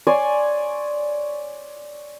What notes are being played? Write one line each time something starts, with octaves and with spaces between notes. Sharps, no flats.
C#5 D5 G#5 C6